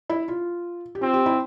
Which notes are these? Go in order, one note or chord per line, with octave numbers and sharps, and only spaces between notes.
E4
F4
G4
C4 F4
G4
E4